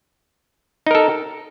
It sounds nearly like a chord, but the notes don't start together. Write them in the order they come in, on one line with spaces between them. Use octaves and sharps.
D#4 A#4 A4